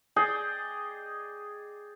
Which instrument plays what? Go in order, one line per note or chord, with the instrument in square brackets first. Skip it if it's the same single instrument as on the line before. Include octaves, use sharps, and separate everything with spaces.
[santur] G#4 D5 D#5 G5